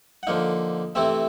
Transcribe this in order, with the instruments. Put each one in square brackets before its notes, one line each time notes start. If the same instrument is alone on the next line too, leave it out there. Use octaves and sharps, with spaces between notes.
[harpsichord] F#5
D3 F3 A#3 D#4 F5
C3 E3 A3 C4 E4 E5